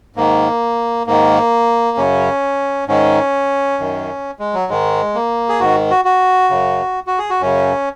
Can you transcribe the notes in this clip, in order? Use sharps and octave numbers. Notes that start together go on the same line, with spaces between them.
G#2 D#3 A#3
G#2 D#3 A#3
F#2 C#3 C#4
G#2 D#3 C#4
F#2 D#3
G#3
F#3
G#2 D#3 G#3
A#3
G#4
G#2 D#3 F#4
F#4
F#4
F#2 C#3
F#4
G#4
F#4
F#2 C#3 C#4